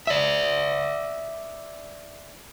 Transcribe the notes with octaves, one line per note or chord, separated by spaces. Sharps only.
D5 E5